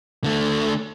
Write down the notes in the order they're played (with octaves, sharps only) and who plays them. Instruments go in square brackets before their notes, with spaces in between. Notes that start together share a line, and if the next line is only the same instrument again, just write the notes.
[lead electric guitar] D3 A3